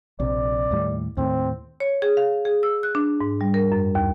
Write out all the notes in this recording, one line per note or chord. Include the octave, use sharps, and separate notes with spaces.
A#1 C3 D5
D#2 A2 G3
D#2 A2 C4
C#5
G#4
F5
G#4
E6
F#6
D4
G#2
G3
A#4
F#2
D#2